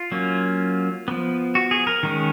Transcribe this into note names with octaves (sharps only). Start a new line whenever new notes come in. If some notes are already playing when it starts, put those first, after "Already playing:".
Already playing: F4
F#3 A#3 C#4
F3 B3
F#4
G#4
A#4
D#3 G#3 C#4